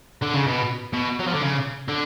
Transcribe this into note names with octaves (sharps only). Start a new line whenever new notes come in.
D3
C#3
B2
B2
F#3
F3
D3
C#3
D3